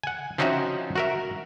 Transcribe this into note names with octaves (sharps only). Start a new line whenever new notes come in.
F#5 G#5
F3 C4 C#4 D#4 F#4 E5
F#4 A#4 E5